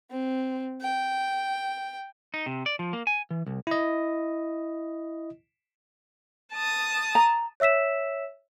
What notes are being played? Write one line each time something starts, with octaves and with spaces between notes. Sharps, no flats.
C4
G5
D#4
C3
D5
F3
A#3
G#5
E3
C2
E4 D#5
A5 D#6
A#5
C#5 E5 E6 B6 E7